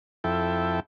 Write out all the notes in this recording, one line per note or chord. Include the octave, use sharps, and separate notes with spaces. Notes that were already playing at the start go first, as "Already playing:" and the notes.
F2 E4 A4 G5